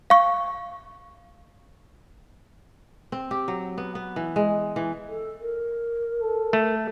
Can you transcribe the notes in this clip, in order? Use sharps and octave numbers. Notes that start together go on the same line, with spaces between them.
F5 C#6
C4
G4
F#3
B3
B3
E3
G#3
E3
A4
A#4
A4
A3